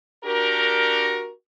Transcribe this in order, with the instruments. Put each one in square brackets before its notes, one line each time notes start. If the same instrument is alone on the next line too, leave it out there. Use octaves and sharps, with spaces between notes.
[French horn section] D4 F#4 G4 A#4